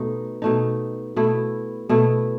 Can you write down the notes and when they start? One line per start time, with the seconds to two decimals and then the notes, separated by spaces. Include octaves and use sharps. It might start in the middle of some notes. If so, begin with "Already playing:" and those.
Already playing: B2 A3 D#4
0.42 B2 A3 D#4
1.16 B2 A3 E4
1.89 B2 A3 E4